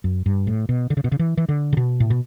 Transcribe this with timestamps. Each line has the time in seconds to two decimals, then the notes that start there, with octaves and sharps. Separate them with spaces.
0.04 F#2
0.26 G2
0.47 A2
0.69 B2
0.90 D3
0.97 C#3
1.04 B2
1.12 C#3
1.19 E3
1.37 E3
1.49 D3
1.73 C#3
1.77 B2
2.00 A2
2.10 B2